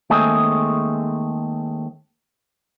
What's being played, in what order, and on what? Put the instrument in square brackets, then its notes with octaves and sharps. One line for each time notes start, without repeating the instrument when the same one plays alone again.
[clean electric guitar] D#2 G#3 A3 C4 G#4